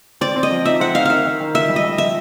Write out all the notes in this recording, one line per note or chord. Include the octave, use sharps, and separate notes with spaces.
C4 D5
C4
D#5
F3
D#4 E5
C4 F#5
D#4 F5
D#3 E5 F5
D#3
D#3
F4 E5
G3
D#5
G3
F3 E5